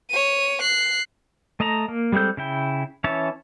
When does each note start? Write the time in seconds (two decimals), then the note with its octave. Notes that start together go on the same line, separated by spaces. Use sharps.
0.11 C#5 D#7
0.61 F#6 C7
1.60 A3 D#5 A5 A#5
1.88 A#3
2.12 G3 G#3 C4 A4 G6
2.37 C#3 E4 G5
3.04 E3 C#4 C#5 E5 A5